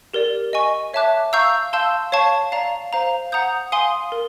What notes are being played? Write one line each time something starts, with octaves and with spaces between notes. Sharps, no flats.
G4 A#4 D5
D#5 G#5 C#6
C#5 E5 A5 D6 F#6
F5 A#5 C#6 E6 G6
F5 A5 C6 E6 G6
C#5 F5 A5 C#6
D5 F5 A#5
C5 F5 A#5
F#5 A#5 D#6 G6
F5 G#5 C6 D#6
A#4